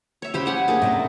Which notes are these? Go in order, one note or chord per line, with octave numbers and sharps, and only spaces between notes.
C#5 E5
C#3 G4 G#4 C5 B5
C#5 F#5 G#5
A#3 C#4 D4 G#4
A2 C3 D#4